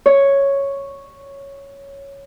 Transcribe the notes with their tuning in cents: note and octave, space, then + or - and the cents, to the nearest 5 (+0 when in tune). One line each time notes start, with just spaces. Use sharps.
C#5 +0